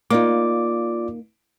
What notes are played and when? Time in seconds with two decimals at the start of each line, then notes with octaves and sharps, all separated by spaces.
0.10 A#3 D#4 F4 D5 D6